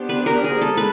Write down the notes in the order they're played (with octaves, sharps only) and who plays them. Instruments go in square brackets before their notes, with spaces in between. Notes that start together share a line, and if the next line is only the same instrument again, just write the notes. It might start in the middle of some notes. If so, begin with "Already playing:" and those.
Already playing: [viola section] B3 D4 G4 C5
[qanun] B4
A#4
G#4
[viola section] G#3 [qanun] A4
[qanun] B4